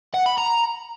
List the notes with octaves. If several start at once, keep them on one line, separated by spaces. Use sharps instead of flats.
F#5
B5
A#5